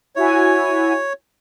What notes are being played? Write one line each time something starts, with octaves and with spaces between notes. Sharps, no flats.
E4 F#4 C#5 G#5